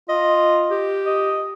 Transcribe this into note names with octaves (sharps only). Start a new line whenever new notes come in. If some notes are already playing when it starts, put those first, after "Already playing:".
F4 D#5
G4
D#5